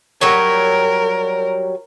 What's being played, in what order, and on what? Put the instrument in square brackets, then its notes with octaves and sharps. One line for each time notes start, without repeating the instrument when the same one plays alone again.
[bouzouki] F#3 G3 C#5 [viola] A#4